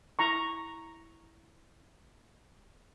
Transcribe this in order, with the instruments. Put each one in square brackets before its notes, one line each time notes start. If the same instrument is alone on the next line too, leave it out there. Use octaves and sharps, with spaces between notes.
[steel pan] E4 A#5 C#6